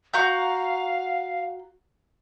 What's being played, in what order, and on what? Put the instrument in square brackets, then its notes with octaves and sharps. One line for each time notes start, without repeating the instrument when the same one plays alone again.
[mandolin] F#4 A#5 G6 [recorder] F5